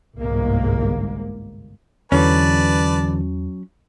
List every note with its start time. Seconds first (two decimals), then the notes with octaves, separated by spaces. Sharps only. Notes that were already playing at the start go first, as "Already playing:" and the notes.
0.17 G1 C2 G#2 G#3 A#3
2.12 E2 D3 E3 F#3 C#4 B4 D5 A5